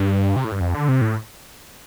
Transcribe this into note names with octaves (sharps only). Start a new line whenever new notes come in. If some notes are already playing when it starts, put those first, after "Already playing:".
Already playing: G2
C3
A2
G2
F2
D3
C3
A2